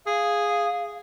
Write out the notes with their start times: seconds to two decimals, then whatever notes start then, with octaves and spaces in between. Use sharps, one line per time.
0.06 G#4 F5